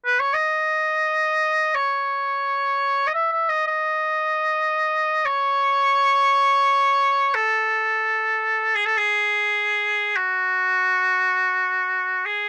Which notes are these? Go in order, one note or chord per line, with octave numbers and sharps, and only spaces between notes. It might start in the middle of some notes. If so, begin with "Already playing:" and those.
B4
C#5
D#5
C#5
D#5
E5
E5
D#5
D#5
C#5
A4
G#4
A4
G#4
F#4
G#4